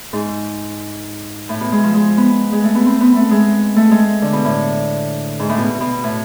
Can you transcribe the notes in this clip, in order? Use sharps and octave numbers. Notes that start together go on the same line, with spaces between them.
G#2
A2
B2
G#3
F3
G#3
B3
G#3
A3
B3
C4
B3
A3
G#3
A3
G#3
D3
B2
A2
G#2
A2
B2
B2
A2